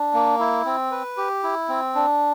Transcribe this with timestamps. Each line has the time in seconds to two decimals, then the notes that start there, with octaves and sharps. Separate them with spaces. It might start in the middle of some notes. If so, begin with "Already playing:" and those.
Already playing: D4
0.14 A#3
0.39 E4
0.66 C4
0.91 B4
1.17 G4
1.43 E4
1.69 C4
1.95 D4